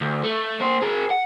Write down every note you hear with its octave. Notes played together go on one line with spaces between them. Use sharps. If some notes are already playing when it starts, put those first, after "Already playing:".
D2
A3
A#3 C5
G#4 A#4
F#5